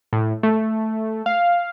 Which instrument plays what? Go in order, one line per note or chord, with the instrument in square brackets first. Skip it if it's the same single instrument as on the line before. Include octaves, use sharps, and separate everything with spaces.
[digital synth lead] A2
A3
F5